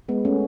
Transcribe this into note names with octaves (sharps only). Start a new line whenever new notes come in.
G#3 B3
A3 C#4